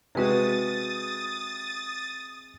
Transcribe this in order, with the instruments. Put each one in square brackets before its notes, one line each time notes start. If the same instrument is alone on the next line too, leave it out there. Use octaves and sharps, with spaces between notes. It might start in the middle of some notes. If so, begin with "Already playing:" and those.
[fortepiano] C3 G#3 F#4 [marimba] G#4 B4 [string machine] D#6 A6